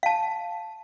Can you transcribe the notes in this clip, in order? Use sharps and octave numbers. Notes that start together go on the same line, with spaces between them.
F5 A5